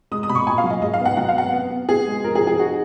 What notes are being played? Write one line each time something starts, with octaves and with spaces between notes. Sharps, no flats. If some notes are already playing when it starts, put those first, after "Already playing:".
G#3 D#6
D#6
B2 B5
C#6
A#2 G#5
F5
F#3
D#5
G#2 D#5
F5
B3
F#5
F#3 F#5
F5
B3 F#5
B3
B3
B3 G#4
G#3
F3 A#4
G#4
F3
G#4
D#4 F#4